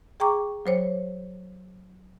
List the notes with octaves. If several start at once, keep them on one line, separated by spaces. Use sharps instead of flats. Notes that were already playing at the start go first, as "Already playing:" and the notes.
G#4 G5 A#5 C#6 D6
F#3 C5 C#5